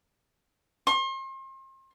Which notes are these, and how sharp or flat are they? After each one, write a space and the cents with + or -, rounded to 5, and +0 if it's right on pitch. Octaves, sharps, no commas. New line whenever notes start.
C6 +40